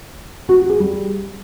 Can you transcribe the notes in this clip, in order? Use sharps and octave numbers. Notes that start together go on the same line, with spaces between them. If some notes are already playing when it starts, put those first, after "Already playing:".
F#4
F#4
G#4
G3